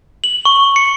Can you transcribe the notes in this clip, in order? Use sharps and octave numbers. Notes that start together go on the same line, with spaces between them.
F#7
C#6
C#7